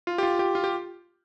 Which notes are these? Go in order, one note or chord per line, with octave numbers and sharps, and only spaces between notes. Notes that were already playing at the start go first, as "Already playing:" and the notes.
F4
G4
F4
G4
F4
G4